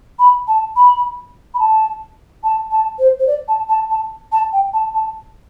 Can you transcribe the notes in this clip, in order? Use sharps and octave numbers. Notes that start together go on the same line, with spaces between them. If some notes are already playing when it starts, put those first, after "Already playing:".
B5
A5
B5
B5
A5
A5
A5
C5
C5
D5
A5
A5
A5
A5
G5
A5
A5